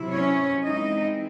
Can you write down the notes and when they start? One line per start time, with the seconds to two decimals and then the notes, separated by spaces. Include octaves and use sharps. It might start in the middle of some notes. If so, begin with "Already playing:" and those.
Already playing: C3 F#3 E4
0.11 C#4 C#5
0.64 E3 G#3 C4 D#4 E4 D#5